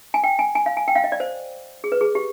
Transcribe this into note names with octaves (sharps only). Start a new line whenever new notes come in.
G#5
G5
G#5
G#5
F5
G#5
G5
F5
D#5
D5
C5
G#4
B4
G#4
G4